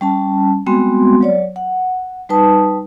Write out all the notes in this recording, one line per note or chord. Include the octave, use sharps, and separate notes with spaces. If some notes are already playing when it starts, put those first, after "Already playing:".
G3 C#4 A5
G3 G#3 B3 C4 F#4 C6
F#3 C#5 D5
F#5
G3 D#4 B4 A5 D#6